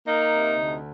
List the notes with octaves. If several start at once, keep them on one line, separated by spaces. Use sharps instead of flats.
A#3 D#4
C3
D2